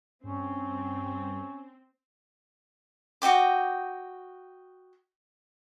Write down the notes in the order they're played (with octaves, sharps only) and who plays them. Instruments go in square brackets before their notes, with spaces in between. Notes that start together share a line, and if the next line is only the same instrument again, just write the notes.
[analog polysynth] G2 [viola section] C4 [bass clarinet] C#4
[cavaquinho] F#4 D#5 G5 D6